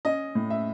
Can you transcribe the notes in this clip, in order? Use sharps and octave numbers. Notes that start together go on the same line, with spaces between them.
C#4 D#5
A2
E5